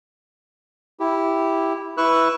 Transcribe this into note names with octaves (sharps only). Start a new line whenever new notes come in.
E4 G4
E4 B4 C#6 E6 F#6